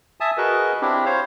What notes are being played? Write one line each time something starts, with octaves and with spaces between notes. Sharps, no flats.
E5 G#5 A5 D#6
F#4 G#4 A#4 B4 D#5
C4 D4 E4 G4
C5 C#5 F5